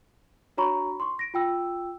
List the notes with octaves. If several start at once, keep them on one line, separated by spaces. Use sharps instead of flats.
D4 F#4 C#5 A#5 B5 C#6
C6 C#6
A#6 D7
F4 G5 E6